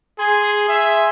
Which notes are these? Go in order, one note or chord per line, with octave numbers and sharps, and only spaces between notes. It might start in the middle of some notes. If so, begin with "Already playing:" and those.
G#4 G#5 C6
E5